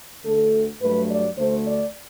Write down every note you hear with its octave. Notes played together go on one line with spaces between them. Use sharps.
D2 D3 A3 A4
G2 F#3 A3 B4
D5
D2 D3 A3 C5
D5